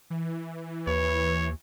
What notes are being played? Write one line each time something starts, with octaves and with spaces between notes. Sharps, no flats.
E3
D#2 B4 C#5